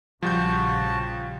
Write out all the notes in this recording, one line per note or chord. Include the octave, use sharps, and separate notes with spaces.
A#1 C#3 F3 G3 F#4 A5 G6